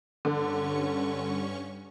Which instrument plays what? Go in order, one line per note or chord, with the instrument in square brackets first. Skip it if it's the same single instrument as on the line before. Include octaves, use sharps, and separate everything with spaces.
[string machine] G2 C#4 C#6 [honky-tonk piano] D3